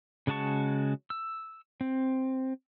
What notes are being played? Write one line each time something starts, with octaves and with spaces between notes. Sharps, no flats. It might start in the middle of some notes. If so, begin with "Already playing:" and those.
C#3 G#3 F#4 A5 C#6
E6
C4